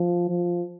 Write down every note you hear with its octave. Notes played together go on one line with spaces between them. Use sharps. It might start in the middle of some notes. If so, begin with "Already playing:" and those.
Already playing: F3
F3